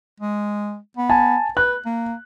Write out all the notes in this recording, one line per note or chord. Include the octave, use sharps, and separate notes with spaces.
G#3
B3
G#5 A5
B4 F#6
A#3